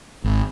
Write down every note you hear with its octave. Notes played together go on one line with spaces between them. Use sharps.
G#1